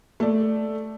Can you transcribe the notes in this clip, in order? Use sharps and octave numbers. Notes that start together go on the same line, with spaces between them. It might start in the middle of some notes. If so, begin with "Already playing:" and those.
A3 D5